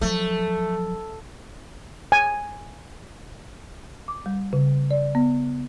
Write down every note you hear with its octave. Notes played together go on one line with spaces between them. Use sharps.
F3 F#3 A3
G#5
D6
G3
C#3
D5
B3